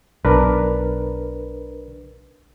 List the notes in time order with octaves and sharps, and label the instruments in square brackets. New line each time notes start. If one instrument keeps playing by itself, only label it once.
[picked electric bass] B1 [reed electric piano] D4 A#4 B4